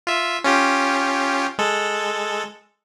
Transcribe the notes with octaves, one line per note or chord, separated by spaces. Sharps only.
F4 E5
C#4 F4 G4
G#3 A4